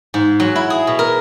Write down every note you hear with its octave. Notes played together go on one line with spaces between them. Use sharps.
G#2
F#3
E4
G#4
B2
A#4